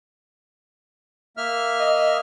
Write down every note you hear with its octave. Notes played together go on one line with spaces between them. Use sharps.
A#3 E5 F6
D#5